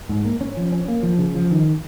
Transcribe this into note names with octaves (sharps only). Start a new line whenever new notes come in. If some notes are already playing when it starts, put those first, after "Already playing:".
G#2
A#3
C#4
F3
C#4
A#3
F3
C#3
F3
D#3